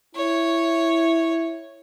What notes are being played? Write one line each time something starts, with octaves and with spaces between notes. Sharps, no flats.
E4 C#5